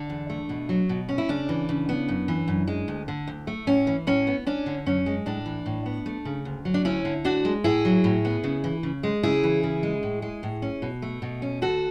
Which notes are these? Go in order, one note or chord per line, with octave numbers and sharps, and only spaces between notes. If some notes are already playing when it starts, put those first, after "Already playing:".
Already playing: D3 D4
E2
A3
B2
F#3
B2
C#4
E4
C#3 D4
E3
C#3
B3
F#2
E3
F#2
G#3
D2
D3
D2
A3
A2 C#4
E3
A2 C#4
B3
C#4 D4
D3
F#2 C#4
G#3
A2 D4
E3
A2
B3
A3
C#3
D2
F#3
D4
D2 C#4 E4
D3
D2 D4 F#4
G#3
A2 E4 G#4
F#3
A2
B3
C#3
E3
C#3
G#3
C#3 E4 G#4
E3
C#3
G#3
A2
G#3
A2
C#4
B2
A3
B2
C#4
D2 F#4 A4